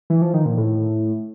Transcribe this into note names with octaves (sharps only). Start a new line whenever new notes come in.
E3
F3
D#3
A#2
A2